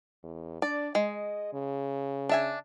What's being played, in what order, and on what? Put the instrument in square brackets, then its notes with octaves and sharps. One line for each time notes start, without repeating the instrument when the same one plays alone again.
[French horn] E2
[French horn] D4 [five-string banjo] D5
[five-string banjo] G#3 [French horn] D#5
[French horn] C#3
[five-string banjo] D4 E5 G#5